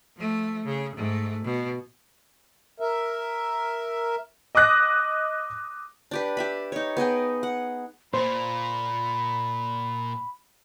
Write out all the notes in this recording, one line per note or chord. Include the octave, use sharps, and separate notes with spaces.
F3 A3
C#3 G#4
G#2 A3
B2
A#4 E5
D#5 D6 D#6 F#6 A#6
D4 G4 B4
G4 E5 B5
D#4 C#5
B3 G#4 D#5 G5
F#5
A#2 C5 B5